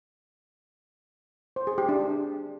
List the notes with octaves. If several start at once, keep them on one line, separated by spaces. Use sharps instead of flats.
C5
G#4
G4
D4